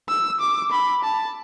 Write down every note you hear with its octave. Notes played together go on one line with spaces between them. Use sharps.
E6
D6
B5
A5